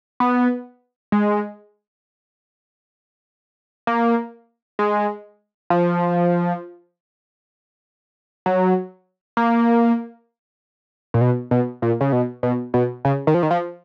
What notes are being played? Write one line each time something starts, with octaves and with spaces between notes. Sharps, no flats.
B3
G#3
A#3
G#3
F3
F#3
A#3
A#2
B2
B2
A#2
C#3
B2
B2
B2
C#3
D#3
F3
D#3
F3